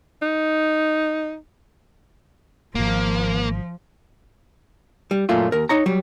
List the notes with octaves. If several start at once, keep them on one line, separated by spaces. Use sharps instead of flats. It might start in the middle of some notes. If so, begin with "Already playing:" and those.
D#4
D#1 G#1 F3 A#3
G3
F#2 A#2 A3 A#3 C#4 F4
D#2 A#4
D#4 C#5 A#5
F#3 G3